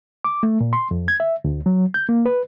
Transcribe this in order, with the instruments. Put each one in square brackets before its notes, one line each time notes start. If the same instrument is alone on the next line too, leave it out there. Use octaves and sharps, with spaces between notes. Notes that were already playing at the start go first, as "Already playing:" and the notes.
[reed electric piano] D6
A3
A#2
C6
F2
G#6
E5
D2
F#3
G6
A#3
B4